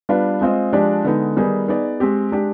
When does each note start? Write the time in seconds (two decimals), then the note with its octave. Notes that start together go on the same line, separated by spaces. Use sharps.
0.09 G3 B3 D4 F4 B4
0.41 G#3 C4 F4 C5 D#5
0.73 F3 G#3 D4 G4 D5
1.04 D3 G#3 B3 D#4
1.36 D#3 G3 B3 D#4 G#4
1.68 B3 D#4 G#4 D5
2.00 G#3 C4 G4
2.32 G#3 D4 G4